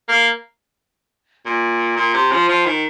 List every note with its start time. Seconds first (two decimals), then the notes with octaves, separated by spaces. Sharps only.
0.09 A#3
1.46 A#2
1.97 A#2
2.14 C3
2.32 F3
2.49 F3
2.66 D#3